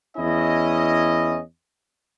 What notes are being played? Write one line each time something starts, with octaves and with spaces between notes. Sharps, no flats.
E2 C#4 E4 D#5